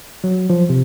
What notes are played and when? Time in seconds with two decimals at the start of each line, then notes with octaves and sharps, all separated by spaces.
0.24 F#3
0.50 F3
0.69 C3